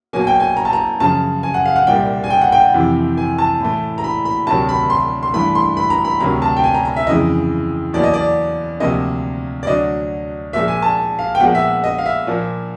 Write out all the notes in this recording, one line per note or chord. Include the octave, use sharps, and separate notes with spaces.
B2 F#3 A#3 G#5
G5
G#5
A#5
A5
A#5
F#2 C#3 F3 A5
G#5
F#5
F5
F#5
C2 A#2 G3 G5
G#5
G5
F#5
G5
F2 C3 E3
G#5
A5
A2 E3 A3
A#5
B5
B5
D2 C3 D#3 F#3 A5
B5
C6
C6
G2 E3 A3 B5
C6
B5
A#5
B5
D2 C3 D#3 F#3 A#5
A5
G5
G#5
A#5
A#5
E5
F2 C#3 E3 G#3 D#5
E2 B2 F#3 A#3 D5
D#5
D5
D2 C3 F3 A#3 D#5
D5
D2 D3 F#3 D#5
A#2 F3 G#3 E5
G#5
A5
F5
G5
A#2 F3 G#3 B3 F#5
E5
D#5
F5
E5
A#2 F3 A#3